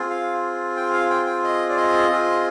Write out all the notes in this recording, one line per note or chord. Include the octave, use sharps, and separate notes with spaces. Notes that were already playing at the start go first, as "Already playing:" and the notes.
Already playing: C4 F4 G#4
F5
G5
F5
G5
G5
D#5
D5
D#5
C4 F4 G#4